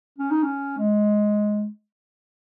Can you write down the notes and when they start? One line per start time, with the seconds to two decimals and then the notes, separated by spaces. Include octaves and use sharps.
0.18 C#4
0.31 D#4
0.43 C#4
0.78 G#3